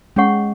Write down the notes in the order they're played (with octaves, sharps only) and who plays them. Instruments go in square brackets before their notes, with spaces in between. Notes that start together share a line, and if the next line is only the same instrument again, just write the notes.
[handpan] G#3 [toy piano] C#4 G#4 C#5 F#5 C#6